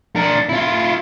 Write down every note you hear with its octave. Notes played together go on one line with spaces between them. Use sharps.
D4 A#4
E4 F4